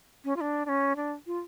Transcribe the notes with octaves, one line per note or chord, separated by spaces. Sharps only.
C#4
F4
D4
D4
C#4
D4
F4